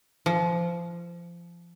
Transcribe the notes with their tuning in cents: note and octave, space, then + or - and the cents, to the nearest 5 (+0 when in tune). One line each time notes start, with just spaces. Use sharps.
F3 -25